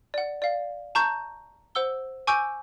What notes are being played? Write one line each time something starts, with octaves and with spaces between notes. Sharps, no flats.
D5 F#5
D5 F5
A5 A#5 C#6 G6
C5 F#5 E6 G7
G#5 C#6 D6 E6 G6 D7